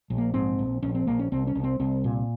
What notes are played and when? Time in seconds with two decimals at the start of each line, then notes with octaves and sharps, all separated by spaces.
0.10 A#1
0.18 A#3
0.34 G#2 C4
0.59 A#1
0.83 A#1 C#4
0.95 C4
1.07 A#1 A#3
1.19 C#4
1.32 C2 C4
1.47 C#4
1.55 C2
1.64 C4
1.80 C2 C4
2.04 A#2